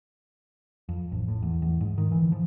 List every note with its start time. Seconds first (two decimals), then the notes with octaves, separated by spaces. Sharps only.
0.89 F2
1.12 A1
1.28 A2
1.43 E2
1.62 E2
1.81 G#2
1.98 D#3
2.12 E3
2.32 F3